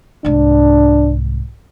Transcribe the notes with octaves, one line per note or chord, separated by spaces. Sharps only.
C2 G#2 D4